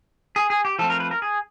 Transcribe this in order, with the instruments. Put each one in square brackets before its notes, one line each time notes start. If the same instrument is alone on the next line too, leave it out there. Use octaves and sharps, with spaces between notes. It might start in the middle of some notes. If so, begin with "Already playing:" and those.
[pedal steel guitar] G#4
G#4
G4
F3 A3 C4 A4
A#4
B4
A#4
G#4